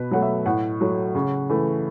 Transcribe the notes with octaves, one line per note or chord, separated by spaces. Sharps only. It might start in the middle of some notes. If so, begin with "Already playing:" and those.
Already playing: B2 B4
F#3 A3 F#5
E5
A2 F#5
F#3 A3
C#3
E3 A3